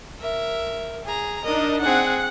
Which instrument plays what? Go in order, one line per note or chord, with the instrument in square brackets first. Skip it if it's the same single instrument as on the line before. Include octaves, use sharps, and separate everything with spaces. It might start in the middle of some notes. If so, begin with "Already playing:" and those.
[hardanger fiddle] A#4 E5
G#4 A#5
[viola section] D4 D#4 A#4 [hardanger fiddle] D#5
[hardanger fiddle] C4 G#4 [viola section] F#5